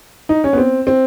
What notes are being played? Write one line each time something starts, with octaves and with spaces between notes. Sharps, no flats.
D#4
C#4
B3
C4
C4